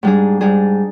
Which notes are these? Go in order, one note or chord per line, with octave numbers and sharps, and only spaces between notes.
G#2 G3 D4 G#4
G#2 G3 D4 G#4